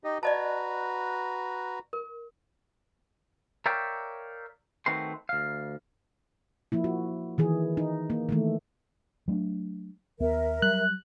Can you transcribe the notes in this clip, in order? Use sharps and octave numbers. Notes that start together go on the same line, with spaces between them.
D#4 G4 D#5
F#4 B4 D5 D#5 A5 A#5
A#4
A#4 C#5 D5 E5 F5 G5
D#3 A3 C4 F#4 B4 C6
D2 F5
F3 A#3 E4
F#4
D#3 E3 G#4
D#4
A#3
D#3 E3 A3
F#3 A3 D4
D#2 B3 A#4 E5
F#3 G3 F#6